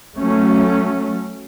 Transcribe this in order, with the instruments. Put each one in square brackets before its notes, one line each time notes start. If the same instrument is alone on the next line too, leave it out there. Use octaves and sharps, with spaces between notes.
[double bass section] F#3 A3 C#4